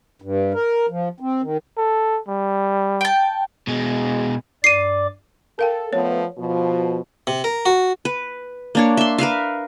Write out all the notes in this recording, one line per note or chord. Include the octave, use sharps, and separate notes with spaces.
G2
A#4
F3
C4
D#3
A4
G3
G5 A5
B2 G#3
G2 D5 D6 C7 D#7
A4 A#4 F5 G5
F3 A3 B3 C#5
B2 F3
C3
A#4
F#4
B4
A#3 D4 C#5
E5 C6
A#4 B4 E5 F5